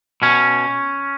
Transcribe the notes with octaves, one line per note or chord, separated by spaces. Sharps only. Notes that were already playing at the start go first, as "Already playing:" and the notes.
B2 C#4